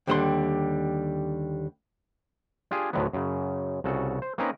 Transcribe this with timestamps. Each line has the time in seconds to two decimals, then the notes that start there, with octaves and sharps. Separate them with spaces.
0.07 D#2 D3 G3 E5 F#5 C6
2.71 D4 F4 G4 G#4 G#5
2.93 D2 A2 D3 D#3 F#3 B3
3.13 F#2 C#3
3.84 C2 C#3 F#4 A4
4.22 C5
4.38 A#3 C4 C#4 D#4 A#4 B4